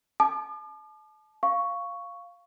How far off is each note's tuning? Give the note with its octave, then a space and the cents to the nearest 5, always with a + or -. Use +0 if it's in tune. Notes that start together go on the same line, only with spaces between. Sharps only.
A5 -35 D6 +45
F5 +0 C#6 +5